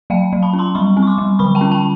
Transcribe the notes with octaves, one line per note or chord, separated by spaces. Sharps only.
F#3 F5 G5
F#3
A5 B5
C#4
A#5 C6
G3 B5 C#6
C4
C#6
C6 D6
G3
D3 B5 C#6
G5 A5
C#4
G5 A5